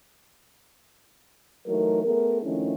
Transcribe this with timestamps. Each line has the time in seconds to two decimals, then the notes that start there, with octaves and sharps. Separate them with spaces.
1.66 E3 F#3 A3 D#4 A#4
2.03 A3 B3 G#4 A#4
2.42 D#3 F3 A3 C#4 D4 E4